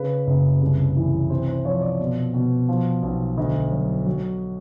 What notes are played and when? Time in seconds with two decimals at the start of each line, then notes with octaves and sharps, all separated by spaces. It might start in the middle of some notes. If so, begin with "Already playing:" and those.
Already playing: C#3 B4
0.27 F#1
0.61 C2
0.96 E3
1.30 C3 C5
1.48 C5
1.65 F3 C#5
1.82 D5
1.99 B2
2.34 B2
2.68 F3
3.03 B1
3.38 D2 D#5
3.72 F#3
4.06 F#3